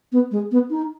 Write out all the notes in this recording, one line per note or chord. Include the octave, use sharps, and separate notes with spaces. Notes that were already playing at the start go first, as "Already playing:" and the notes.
B3
G#3
B3
D#4